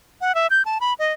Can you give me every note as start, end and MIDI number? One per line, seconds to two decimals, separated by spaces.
0.21 0.35 78
0.35 0.47 76
0.50 0.62 91
0.65 0.78 81
0.81 0.94 83
0.99 1.13 75